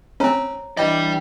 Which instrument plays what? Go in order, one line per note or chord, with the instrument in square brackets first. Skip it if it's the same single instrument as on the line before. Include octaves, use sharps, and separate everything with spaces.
[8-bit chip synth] C4 C#4 [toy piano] C5 C#5 A#5
[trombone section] G2 E3 [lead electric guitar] D5 G5 [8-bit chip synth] D#5